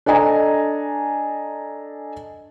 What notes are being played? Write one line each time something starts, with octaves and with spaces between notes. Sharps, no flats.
D4 A4 D#5 G#5 A#5